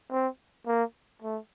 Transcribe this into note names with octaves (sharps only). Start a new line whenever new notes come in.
C4
A#3
A3